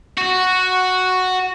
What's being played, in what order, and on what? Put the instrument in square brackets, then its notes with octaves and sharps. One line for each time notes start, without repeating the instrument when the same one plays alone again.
[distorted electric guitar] F#4